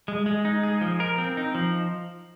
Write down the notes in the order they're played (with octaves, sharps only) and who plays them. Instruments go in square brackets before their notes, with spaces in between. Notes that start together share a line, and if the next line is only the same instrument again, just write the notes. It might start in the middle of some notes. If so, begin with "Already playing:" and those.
[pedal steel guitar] G#3
G#3
D#4
G#4
F3
A#4
C4
D#4
F3